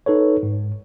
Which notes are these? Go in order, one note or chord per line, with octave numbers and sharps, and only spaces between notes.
D#4 A4 B4 C#5
G#2